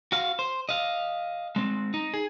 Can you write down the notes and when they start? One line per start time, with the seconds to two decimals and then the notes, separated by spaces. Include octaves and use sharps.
0.12 F#4 F5
0.39 C5
0.69 D#5 F5
1.56 G#3 C4
1.94 D#4
2.14 G#4